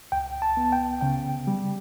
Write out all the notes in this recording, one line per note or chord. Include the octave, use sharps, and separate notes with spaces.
C#2 G5
A5
B3
G5
C#3 G5
G3